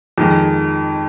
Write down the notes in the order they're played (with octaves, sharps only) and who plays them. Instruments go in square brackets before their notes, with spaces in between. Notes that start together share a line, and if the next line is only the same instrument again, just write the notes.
[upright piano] F2 D#3 G#3